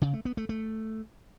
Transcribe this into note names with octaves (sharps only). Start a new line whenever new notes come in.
C#3
A3
B3
A3
A3